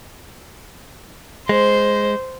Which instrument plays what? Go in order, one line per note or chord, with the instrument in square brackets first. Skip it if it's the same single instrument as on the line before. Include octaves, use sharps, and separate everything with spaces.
[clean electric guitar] G#3 [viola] C5